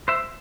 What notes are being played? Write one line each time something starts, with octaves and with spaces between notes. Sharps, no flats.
C5 E5